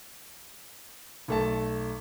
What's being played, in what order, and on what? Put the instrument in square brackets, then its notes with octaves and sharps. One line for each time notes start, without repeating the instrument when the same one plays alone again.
[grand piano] B1 A3 A5